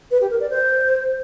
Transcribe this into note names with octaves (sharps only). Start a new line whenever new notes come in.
B4
G4
A#4
D5
C5